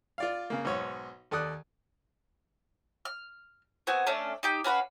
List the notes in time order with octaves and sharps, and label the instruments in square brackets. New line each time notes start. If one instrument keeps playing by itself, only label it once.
[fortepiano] F4 D5 F5
C#3 A#3
B1 G#2 C#5
D#2 A4 D5 D#6 F#6
[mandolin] F6
B3 C4 F#4 G#5
A3 C#4 D4 A4
D#4 G4 G6
C#4 F#4 B4 F5